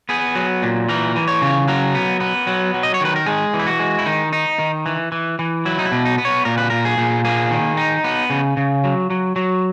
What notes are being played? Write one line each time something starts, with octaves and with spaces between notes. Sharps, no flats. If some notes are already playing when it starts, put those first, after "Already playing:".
B3 G#4
F#3
A#2
E3 A#4
E3
C#5
C#3
F#3 A#4
B3
B3
F#3
F#3
D#5
C#5
D#3 B4
A#4
G#3 G#4
E3
E4
F#4
G#3
E4
D#3 D#4
D#4
D#3
E3
E3
E3
F#3 E4
D#4
E4
B2
D#4
B3
C#5
A#2 A#4
B4
A#2 A#4
G#4
A#2
A#3 G#4
D#3
D#4
B3
C#3
C#3
F#3
F#3
F#3